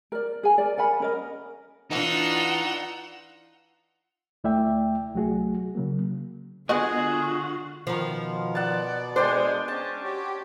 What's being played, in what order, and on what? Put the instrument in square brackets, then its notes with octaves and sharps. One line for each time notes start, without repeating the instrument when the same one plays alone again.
[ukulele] A#4 D5
G#4 G#5
A#4 D5
A#4 F#5 G#5 B5
C#4 A#4 D#5
[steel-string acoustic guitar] E3 D4 [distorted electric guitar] D#4 [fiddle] F4 E6 [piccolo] F#5
[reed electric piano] D2 A3 E4 D5 E5 G5
C2 F#3 A3 F#4 G#4
C#3 F#3 A#3
[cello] D3 F4 [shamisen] G#3 B3 D#5 [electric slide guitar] F#4 [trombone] G#4
[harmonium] B2 B3 [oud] D#3 F3
[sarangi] D5 [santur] F#5 A5
[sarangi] G#3 [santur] D4 G5 C6 [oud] C5
[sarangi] C#4 [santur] A5
[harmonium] F#4 C#5 [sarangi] G4